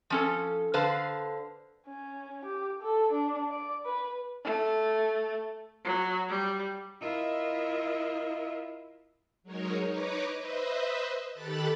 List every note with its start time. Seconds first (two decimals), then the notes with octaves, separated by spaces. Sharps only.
0.10 F3 C#4 A4
0.74 D3 B4 C5 F5 A5
1.87 C#4
2.45 G4
2.82 A4
3.13 D4
3.50 D5
3.85 B4
4.44 A3
5.85 F#3
6.29 G3
7.01 E4 F4 A#4 D#5 E5
9.43 F#3 G#3 D#4 A#4 C#5
9.87 D#4 B4 C#5 D#5 D6
10.37 B4 C5 D#5 E5
11.32 D#3 G4 A4 B5 F#6 A6